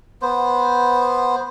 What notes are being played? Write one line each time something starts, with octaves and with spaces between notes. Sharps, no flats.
B3 C5